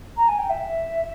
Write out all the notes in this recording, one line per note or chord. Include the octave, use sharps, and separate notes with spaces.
A#5
G#5
G5
E5